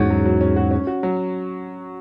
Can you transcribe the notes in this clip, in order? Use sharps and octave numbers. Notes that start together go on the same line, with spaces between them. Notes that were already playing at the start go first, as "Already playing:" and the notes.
Already playing: E2 G#2 C#4 F#4
F#3
F#3
C#4
F#4
C#4
F#4
F#3